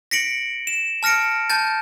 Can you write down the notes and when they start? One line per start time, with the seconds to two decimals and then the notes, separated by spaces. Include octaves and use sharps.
0.11 A#6 B6 C#7 D7 F#7
0.67 E7
1.03 A5 F6 A#6 C#7 D7
1.50 A5 G6 A6